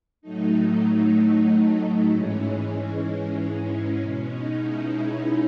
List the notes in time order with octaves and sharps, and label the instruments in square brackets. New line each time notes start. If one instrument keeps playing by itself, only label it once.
[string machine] A2 F#3 A3 D#4
G#2 E3 G#3 C#4
B2 G#3 C#4
D#4
E4
E4